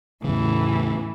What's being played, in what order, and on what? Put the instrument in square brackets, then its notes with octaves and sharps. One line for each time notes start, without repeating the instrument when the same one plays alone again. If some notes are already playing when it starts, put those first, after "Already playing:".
[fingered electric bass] E2 C#3 [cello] A2 E3